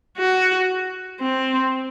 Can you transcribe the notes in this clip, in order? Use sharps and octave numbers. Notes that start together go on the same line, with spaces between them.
F#4
C4